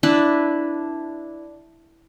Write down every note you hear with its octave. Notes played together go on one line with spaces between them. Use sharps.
D4 E4 B4